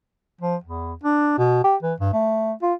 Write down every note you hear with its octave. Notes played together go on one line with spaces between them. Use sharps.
F3
E2
D4
B2
G4
E3
G2
A3
F4